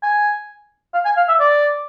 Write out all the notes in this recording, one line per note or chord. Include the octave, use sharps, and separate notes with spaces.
G#5
F5
G#5
F5
E5
D5